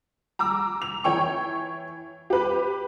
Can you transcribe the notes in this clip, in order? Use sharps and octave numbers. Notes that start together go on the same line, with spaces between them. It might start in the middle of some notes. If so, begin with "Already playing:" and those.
A#5 D6 E6
F7
E3 C#5 G5 C#6
G4 B4